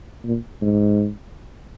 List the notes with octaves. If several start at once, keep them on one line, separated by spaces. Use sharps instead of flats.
A#2
G#2